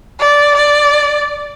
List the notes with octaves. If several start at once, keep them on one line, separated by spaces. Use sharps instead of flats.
D5
D5